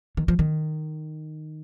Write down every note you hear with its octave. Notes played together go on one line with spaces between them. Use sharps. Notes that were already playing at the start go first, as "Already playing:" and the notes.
D#3
F3
D#3